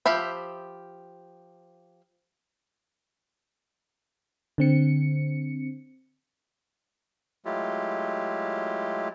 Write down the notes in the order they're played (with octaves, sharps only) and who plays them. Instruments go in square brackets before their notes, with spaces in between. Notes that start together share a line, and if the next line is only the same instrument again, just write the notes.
[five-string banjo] F3 G4 C5 E5 B5
[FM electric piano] D3 C4 C#7
[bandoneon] F#3 G#3 A3 E4 F4 G4